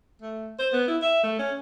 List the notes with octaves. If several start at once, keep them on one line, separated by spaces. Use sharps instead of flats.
A3
C5
B3
E4
E5
A3
C#4